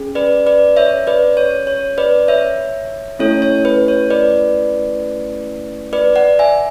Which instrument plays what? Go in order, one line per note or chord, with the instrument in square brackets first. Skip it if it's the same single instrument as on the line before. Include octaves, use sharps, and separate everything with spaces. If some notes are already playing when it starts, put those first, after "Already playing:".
Already playing: [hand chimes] C#4 G#4
B4 D5
B4 D5
C#5 E5
B4 D5
C#5
C#5
B4 D5
C#5 E5
A3 C#4 E4 A4 C#5
C#5
B4
C#5
B4 D5
B4 D5
D5 F#5
E5 G#5